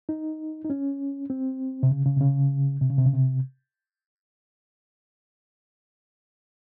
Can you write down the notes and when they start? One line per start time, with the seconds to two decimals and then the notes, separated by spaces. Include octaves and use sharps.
0.09 D#4
0.65 D#4
0.70 C#4
1.30 C4
1.83 C3
1.91 C#3
2.05 C#3
2.16 C3
2.21 C#3
2.81 C3
2.90 C#3
2.98 C3
3.06 C#3
3.13 C3